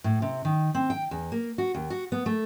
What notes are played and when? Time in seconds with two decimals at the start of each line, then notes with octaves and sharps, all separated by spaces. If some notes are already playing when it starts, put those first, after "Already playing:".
0.04 A2
0.22 C3
0.45 D#3
0.75 C4
0.90 G5
1.11 E2
1.32 A#3
1.58 F#4
1.75 D#2
1.90 F#4
2.12 B3
2.26 A3